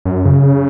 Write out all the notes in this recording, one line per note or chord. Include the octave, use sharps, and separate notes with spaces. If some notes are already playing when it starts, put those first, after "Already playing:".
F#2
C#3